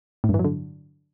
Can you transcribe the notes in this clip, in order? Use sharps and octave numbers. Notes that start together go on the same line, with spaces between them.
A2
G2
E3
F#3
D3